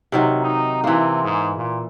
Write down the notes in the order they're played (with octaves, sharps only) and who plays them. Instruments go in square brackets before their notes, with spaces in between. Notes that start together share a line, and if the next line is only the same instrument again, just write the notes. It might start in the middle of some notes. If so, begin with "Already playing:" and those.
[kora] C3 D#3 F#3
[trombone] D#4
[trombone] C3 [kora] E3 A#3
[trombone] G#2
A#2